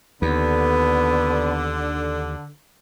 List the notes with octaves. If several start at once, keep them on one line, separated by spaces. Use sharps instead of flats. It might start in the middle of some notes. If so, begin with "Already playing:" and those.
D#2 D3 B3